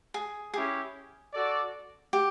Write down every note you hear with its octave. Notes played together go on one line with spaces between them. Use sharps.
G#4
C#4 E4 G4 G#4
F#4 A4 D5
G4